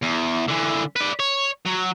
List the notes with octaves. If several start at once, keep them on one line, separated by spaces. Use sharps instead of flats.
E2
D3 E3
B4 D5
C#5
F#3